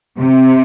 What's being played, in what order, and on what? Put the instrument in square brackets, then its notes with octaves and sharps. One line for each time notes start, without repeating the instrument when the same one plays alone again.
[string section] C3